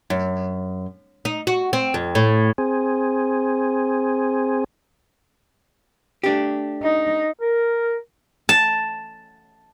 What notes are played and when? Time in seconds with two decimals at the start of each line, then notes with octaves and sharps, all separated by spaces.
0.10 F#2
1.25 D#4
1.47 F#4
1.73 C4
1.94 F2
2.15 A2
2.58 C4 G#4
6.24 A3 D4 G4
6.83 D#4
7.41 A#4
8.49 A5